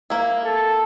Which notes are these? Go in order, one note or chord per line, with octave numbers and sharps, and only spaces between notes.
A#3 E4
A4